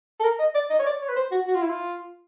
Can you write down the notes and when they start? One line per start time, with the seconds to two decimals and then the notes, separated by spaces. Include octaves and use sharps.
0.20 A4
0.24 A#4
0.39 D#5
0.55 D5
0.70 D#5
0.80 C#5
0.86 D5
1.01 C#5
1.09 B4
1.16 C5
1.31 F#4
1.47 F#4
1.55 F4
1.63 E4
1.70 F4